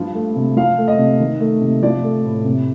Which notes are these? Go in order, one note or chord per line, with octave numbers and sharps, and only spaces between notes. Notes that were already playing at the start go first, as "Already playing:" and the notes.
Already playing: G2 F3
A3
C3
F3 F5
A3
D#5
C3
D#3
A3
C3
F3 D5
A3
A2
C3